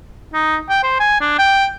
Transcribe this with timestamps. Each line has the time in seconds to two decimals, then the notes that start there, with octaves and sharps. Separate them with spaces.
0.34 D#4
0.70 G5
0.83 C5
1.00 G#5
1.21 D4
1.39 G5